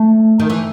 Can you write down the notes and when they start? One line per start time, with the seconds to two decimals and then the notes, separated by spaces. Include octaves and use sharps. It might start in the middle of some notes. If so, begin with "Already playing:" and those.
Already playing: A3
0.39 D#3
0.50 E3